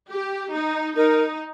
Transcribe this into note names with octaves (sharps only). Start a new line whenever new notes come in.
G4
D#4
D#4 A#4